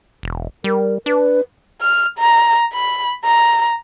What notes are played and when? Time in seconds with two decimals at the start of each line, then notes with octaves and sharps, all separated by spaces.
0.23 E1
0.64 G3 A#4
1.06 D4 B4
1.81 F6
2.18 A#5
2.73 B5
3.24 A#5